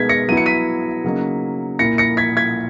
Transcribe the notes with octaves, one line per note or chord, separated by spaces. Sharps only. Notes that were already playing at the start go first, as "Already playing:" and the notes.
Already playing: B2 G#3 B3 D#4 G#6 B6
A#6 C#7
F#3 B3 E4 D#7
C#7
B6 D#7
C#3 F#3 A#3 D#4
A#2 A#3 E4 A#6 C#7
A#6 C#7
G#6 B6
G#6 B6